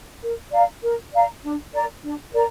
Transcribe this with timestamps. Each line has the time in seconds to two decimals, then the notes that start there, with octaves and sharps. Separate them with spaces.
0.22 A#4
0.51 D5 F5 A#5
0.82 A#4
1.13 D5 F5 A#5
1.42 D4
1.73 A#4 D5 A#5
2.02 D4
2.32 A#4 D5 A#5